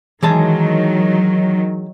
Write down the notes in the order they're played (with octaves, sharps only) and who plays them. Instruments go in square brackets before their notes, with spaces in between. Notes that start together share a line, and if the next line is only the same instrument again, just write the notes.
[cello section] D#3 F#3 [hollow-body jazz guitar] E3 G#3 A5